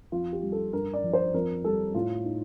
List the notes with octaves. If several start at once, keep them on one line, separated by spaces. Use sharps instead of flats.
F2 F4
G4
G3
A4
G2 A#4
D5
F3
C5
F2 A#4
G3 A4
A2 F4
D#4